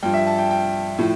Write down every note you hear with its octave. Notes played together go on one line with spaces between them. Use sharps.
G2 F3 G5
E5
A5
G5
G5
A2 F3